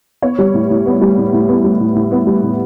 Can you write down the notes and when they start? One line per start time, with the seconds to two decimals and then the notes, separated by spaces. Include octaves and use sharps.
0.22 B3 C#5
0.39 G3
0.54 A2
0.70 A2
0.86 B3
1.01 G3
1.18 A2
1.33 A2
1.48 B3
1.64 G3
1.80 A2
1.95 A2
2.12 B3
2.27 G3
2.43 A2